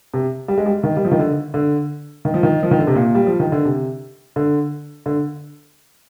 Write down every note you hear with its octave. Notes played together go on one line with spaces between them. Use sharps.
C3
G3
G#3
G3
D#3
G3
F3
D#3
D3
D3
D#3
F3
D#3
F3
D#3
D3
C3
A#2
G3
F3
D#3
D3
C3
D3
D3